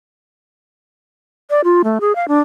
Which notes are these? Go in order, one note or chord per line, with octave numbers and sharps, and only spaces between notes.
D5
F4
A3
G#4
F5
D4